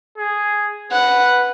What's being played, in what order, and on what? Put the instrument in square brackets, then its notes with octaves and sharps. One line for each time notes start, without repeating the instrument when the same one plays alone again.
[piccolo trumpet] G#4
[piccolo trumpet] B4 [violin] F#5